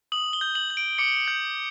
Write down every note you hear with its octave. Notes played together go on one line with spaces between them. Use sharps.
D#6 F#7
G7
G6
F#7
G6
D7
D6 C#7
G6